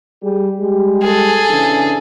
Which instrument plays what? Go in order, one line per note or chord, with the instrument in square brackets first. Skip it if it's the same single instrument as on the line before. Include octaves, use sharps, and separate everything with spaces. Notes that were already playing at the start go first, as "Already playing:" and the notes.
[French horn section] G3 G#4
G3 G#3 G4
[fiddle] G#4 A4
[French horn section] C#3 E3 D4